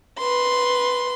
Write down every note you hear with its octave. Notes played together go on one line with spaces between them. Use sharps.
B4 C6